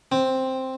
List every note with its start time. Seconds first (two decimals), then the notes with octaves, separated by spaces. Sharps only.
0.12 C4